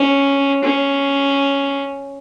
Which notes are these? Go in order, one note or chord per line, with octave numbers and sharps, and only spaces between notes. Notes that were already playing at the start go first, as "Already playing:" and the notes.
Already playing: C#4
C#4